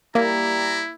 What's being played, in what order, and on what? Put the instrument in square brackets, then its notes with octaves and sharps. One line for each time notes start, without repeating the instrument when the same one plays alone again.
[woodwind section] G3 G4 A#5 [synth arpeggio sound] A#3 [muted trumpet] E4